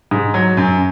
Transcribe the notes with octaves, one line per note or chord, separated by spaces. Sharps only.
G#2
F#3
F#2